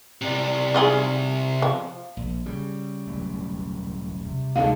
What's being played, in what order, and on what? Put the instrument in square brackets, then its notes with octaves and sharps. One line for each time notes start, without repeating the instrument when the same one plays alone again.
[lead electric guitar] C3 D5
[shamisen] D#4 F4 G#4
F3
[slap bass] A#1
C#3 G3
[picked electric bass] E1 F#3 A3
C3
[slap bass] D2 D3 [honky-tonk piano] G#3 D#4 A4 [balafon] F5